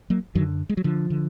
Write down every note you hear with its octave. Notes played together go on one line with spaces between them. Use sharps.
F#3 A#3
F#2 D3 D#3 F#3
G#3
F#3
D3 F3
D3